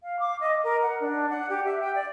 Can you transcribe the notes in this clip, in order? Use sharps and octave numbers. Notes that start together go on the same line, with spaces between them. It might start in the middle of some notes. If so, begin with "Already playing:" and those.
F5
D6
D#5
A#4
F#5
D4
F#5
G4
E5
G5
D5